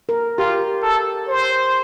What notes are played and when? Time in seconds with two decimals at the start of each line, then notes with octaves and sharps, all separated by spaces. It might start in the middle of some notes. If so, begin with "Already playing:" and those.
0.09 A#4
0.38 F4 G4
0.83 A4
1.28 C5